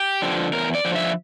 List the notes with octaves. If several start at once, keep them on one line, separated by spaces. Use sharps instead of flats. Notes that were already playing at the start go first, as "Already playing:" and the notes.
Already playing: G4
D3 F3
E2 A#4
D5
D3 F3
E5